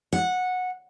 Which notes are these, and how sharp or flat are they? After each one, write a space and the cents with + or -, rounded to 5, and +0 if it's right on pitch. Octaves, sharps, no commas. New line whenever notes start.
F#5 -15